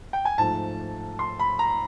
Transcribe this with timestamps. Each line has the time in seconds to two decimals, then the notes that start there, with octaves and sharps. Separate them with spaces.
0.13 G5
0.25 G#5
0.38 G#2 F3 A3 A5
1.19 C6
1.40 B5
1.59 A#5